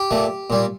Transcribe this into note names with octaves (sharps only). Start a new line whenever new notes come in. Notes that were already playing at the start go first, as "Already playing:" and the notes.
Already playing: G4
A#2 A3
A#2 G3